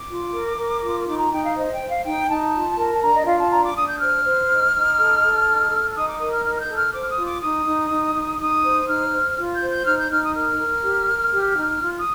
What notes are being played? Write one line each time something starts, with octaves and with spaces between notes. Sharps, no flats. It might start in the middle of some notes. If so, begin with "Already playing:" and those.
Already playing: D6
F4
A#4
A#4
F4
D#4 D6
A#5
D#4 G5
F5
C5 D#5
G5
C5
F5
D#4 G5
D#4 A5
F4
A#4
A5
D4 A#5
D#5
F4 F5
A5
D4 A#5
D6
D4 D#6
G6
C5 F6
C5
D#4
D#4
A4
A4
D#4
A4
D#4 D#6
D6
A#4 D#6
F6
D#4 F6
F6
G6
A4
F6
C5 D6
F6
D#6
F4
D6
D#4 D#6
D#4
D#4
D#4
D#4 D#6
C5
D#4 F6
C5
F4
G6
C5
G6
D#4 F6
G6
D#4 F6
D#6
A#4 F6
A#4
G4
A#4
G4
D#4
F4
D#6